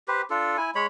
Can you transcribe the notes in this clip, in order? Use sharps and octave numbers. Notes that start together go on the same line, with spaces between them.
G4 B4 C5
D4 F4 A4
E4 G#5
G#3 C#5 B5